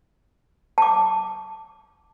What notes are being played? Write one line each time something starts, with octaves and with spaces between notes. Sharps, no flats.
A5 D6